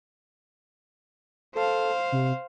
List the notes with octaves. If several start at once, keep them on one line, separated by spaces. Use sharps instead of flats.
A4 C5 F5
C3